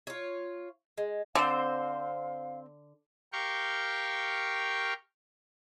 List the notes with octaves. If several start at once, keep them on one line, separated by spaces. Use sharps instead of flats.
F4 C#5
G#3
D3 C4 C5 F5
G4 A#4 F5 G5 C#6